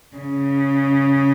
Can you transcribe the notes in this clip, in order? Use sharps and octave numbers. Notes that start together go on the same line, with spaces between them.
C#3